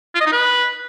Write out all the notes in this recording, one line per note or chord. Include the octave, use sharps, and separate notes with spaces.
F4
D#5
D#4
B4